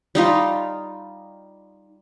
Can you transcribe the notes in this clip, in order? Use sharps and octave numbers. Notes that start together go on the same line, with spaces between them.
G3 D#4 F4